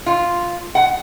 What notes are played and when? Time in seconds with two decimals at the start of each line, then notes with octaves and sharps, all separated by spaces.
0.06 F4
0.75 F#5